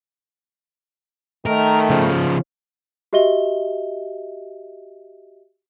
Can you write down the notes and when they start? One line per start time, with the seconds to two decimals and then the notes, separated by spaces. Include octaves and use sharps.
1.46 D#3 A3 A#4
1.90 C#3 F3
3.13 F#4 G4 D#5 E5 G7